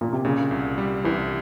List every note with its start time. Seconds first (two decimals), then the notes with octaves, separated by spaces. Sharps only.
0.01 A#2
0.12 C3
0.25 A#2 C#3
0.51 C2
0.78 G3
1.04 C2 E3